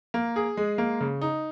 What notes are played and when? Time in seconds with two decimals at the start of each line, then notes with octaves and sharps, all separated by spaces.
0.14 A#3
0.36 G#4
0.57 G#3
0.78 A#3
1.01 C#3
1.21 D#4